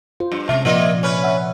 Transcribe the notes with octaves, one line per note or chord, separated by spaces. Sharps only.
F4 C5
G2
C3 G#3 C4 C#4 E5
A#2 F3 A#3 F4 D5 D#5
C#4 B4
E5 F#5